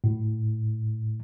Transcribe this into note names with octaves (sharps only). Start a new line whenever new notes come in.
A2